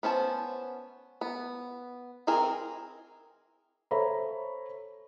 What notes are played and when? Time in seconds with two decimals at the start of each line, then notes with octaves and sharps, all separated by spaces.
0.03 B3 C#4 C5 A5
1.21 B3
2.27 E3 C4 G#4 A#4
3.91 A4 C5 C#5 E5 A#5 B5